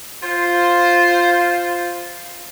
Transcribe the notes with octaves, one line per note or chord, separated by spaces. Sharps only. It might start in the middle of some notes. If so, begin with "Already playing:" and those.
F4 C5